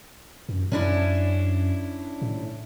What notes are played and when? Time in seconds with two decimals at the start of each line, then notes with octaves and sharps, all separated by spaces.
0.49 F#2
0.72 F#2 C#4 D4 E4
2.22 A2